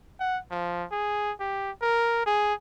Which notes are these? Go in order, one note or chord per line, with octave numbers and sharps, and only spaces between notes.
F#5
F3
G#4
G4
A#4
G#4